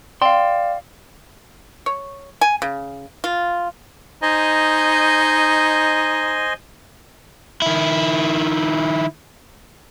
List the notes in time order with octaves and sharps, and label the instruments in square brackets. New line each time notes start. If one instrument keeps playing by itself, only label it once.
[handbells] D5 F5 [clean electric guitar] G5 C6
[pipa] C#5
G#5
C#3
F4
[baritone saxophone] D#4 [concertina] C5 D#5 G#5
[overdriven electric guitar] D#3 E4